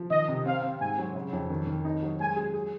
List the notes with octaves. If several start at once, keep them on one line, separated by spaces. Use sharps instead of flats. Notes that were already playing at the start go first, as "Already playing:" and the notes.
Already playing: F3
D#3 D#5
C3
C4 F5
C4
G#2 G#5
F#3
C#3
F2
D#3
D#3
D#4
F#3
G#3 G#5
G#4
G#4